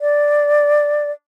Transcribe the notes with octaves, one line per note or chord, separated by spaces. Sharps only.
D5